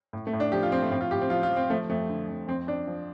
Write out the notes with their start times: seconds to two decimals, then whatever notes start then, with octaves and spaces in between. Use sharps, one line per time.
0.13 A2
0.27 A3
0.33 A2
0.40 D4
0.52 F3 G4
0.63 F4
0.72 F3 C4
0.82 A3
0.91 A2 C4
1.01 F4
1.11 A2 G4
1.21 C4
1.30 F3 F4
1.43 F4
1.50 F3
1.56 C4
1.70 F3 A3
1.90 F2 A3
2.09 D3
2.28 F2
2.47 F2 C4
2.67 F2 D4
2.87 F3